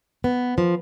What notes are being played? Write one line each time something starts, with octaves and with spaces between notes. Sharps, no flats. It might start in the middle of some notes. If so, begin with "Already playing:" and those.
B3
F3